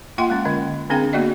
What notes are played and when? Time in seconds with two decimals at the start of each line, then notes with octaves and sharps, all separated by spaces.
0.18 A#3 F4 E5 F#5 G5 C6
0.30 G#3 C#4
0.45 D3 D#5
0.90 D3 C4 D4 G#4 F5 G5
1.13 A#3 B3 F#4 D5 D#5